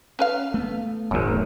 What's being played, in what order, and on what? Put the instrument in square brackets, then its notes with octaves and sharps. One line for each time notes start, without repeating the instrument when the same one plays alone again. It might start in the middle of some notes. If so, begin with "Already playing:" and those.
[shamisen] C#4 B4 F5
[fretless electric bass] A3 B3
[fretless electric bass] D#1 A3 [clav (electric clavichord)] G#1 F#2